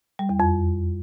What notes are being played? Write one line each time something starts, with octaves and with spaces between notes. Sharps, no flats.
G3
E2
F2